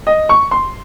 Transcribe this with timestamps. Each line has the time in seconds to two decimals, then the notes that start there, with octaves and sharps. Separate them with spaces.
0.07 D#5
0.29 C#6
0.51 C6